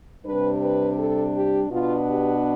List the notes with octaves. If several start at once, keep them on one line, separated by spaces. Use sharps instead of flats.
C3 G3 D4 B4
B4
A4
G4
B2 B3 D4 F4
G4